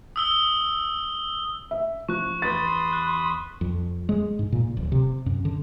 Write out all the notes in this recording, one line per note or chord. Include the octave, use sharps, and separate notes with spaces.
D#6 E6 G7
E5
F3 C#6 F#6
E2 B4 B5 C6 D#6 A6
F#6
F2
G#3
G#2
A#2
D1
C3
F#2
D3